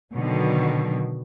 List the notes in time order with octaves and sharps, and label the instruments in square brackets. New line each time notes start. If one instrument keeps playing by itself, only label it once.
[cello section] B2 D3 D#3 F#3